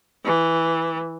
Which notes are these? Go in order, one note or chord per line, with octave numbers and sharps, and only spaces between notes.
E3